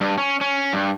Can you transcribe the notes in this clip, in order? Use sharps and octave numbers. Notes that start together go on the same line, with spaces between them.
G2
C#4
C#4
G2